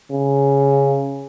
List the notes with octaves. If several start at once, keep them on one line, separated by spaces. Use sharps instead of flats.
C#3